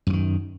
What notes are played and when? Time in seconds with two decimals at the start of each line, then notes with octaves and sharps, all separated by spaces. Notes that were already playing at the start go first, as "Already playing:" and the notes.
0.07 F#2
0.10 E3
0.13 D#3